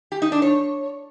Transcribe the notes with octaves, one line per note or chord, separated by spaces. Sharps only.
G4
D#4
D4
C#5